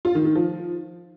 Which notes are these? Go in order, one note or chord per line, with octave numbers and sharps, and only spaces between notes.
F4
D#3
D#3
F3